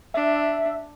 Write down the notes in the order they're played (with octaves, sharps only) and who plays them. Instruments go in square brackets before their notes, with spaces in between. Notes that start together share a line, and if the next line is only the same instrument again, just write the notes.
[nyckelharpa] D4 [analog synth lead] E5